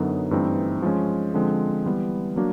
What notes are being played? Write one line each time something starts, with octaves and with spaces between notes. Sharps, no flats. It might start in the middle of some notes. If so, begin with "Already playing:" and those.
Already playing: F#2 D3 F#3 B3 D#4
G2 E3 A3 C4 D#4
F3 G#3 C#4
D3 F3 G#3 C4
E3 G3 B3
F#3 A#3 D4 F#4